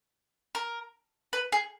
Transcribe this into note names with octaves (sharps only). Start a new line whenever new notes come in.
A#4
B4
G#4